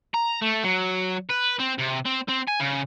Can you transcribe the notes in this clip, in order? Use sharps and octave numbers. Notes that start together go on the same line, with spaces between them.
A#5
A3
F#3
B4
C4
C3
C4
C4
G#5
C#3